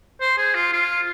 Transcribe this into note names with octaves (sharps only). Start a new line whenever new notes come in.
C5
G#4
F4
F4